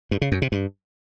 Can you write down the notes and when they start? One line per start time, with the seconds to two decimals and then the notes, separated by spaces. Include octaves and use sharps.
0.11 G2
0.22 C#3
0.32 F#2
0.42 C3
0.52 G2